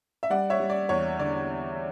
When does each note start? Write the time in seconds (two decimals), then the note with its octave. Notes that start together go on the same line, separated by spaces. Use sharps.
0.23 E5
0.30 G3 D5 F#5
0.50 C#5 E5
0.60 G3
0.70 D5
0.89 E2 C#5
1.19 D3 D5